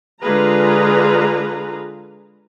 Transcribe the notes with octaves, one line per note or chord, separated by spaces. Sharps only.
D3 G#3 F4 G#4 B4 A#5